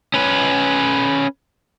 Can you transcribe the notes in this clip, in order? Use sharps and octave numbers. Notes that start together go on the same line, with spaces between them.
C#4 B4